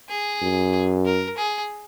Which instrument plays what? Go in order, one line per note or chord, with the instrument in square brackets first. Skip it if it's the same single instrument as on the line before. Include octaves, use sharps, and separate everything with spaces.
[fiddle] G#4
[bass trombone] F#2
[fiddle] A#4
G#4